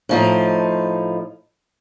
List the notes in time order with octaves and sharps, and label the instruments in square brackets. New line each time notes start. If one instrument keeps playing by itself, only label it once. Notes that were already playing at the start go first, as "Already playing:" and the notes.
[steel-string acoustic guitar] A2 F3 D#4